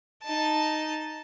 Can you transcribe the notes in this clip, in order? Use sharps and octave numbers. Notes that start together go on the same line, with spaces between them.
D#4 A5